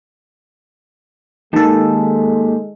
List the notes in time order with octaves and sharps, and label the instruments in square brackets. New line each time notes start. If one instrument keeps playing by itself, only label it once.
[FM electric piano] D#3 A4 [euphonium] G#3 [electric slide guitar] A#3 G4 A5